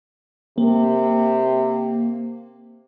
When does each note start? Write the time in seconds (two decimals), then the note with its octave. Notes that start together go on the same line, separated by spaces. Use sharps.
0.58 C3 A#3